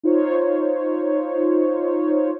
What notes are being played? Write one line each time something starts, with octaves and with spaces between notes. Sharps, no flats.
D#4 F4 C5 C#5